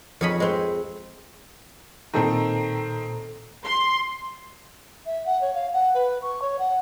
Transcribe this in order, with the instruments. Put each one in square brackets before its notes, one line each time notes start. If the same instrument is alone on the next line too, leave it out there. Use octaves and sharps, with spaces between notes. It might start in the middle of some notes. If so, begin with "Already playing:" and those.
[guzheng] F2 G#4 C#5 D#5 B5
G#3 C4
[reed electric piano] A#2 A4 A#5 [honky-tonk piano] D#3 C4
[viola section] C6
[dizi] E5
F#5
C#5
F5
F#5
B4
C#6
C#5
F#5